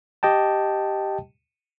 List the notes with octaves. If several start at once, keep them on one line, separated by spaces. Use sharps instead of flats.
G4 D#5 G5 A5